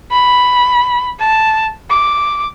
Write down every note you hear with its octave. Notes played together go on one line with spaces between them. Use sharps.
B5
A5
D6